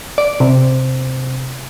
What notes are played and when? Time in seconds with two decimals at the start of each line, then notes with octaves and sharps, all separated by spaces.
0.18 D5
0.40 C3